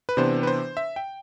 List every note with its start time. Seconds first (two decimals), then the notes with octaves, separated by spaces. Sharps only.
0.09 B4
0.17 C3 E3 B3 D4 C5
0.43 B4
0.47 C5
0.77 E5
0.96 G5